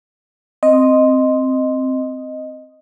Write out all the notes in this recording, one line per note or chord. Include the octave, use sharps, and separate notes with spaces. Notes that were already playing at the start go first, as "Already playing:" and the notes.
C4 D#5